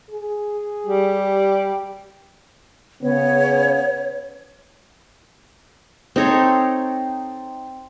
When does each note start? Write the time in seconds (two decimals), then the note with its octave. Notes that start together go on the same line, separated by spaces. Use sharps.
0.10 G#4
0.86 G3 G4
3.03 C#3 B3 C#5
6.16 C4 D#4 A4 C#5